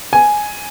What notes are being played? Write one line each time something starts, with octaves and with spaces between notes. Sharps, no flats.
G#5